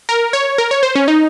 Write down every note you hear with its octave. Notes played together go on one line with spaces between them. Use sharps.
A#4
C#5
A#4
C#5
C5
C#4
D#4